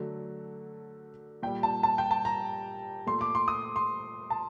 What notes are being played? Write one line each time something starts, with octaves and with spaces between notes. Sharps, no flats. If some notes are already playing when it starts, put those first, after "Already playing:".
Already playing: D3 F#3 A3
A#2 G3 G5
A5
A5
G5
A5
A#5
A#2 A3 C6
D6
C6
D#6
C6
A5